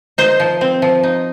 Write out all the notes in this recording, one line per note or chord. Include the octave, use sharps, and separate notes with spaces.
D#4 C5
F3
C4
F3
D#4